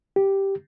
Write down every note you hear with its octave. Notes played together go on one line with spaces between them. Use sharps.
G4